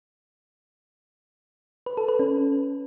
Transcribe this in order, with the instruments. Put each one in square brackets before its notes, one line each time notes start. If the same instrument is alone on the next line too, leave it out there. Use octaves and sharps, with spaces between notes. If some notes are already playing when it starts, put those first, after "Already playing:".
[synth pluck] B4
A4
B4
C#4